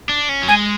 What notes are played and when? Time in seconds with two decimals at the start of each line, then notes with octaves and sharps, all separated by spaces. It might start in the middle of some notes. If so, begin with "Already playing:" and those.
0.09 D4
0.29 C#4
0.43 F#3
0.48 G#3 G#5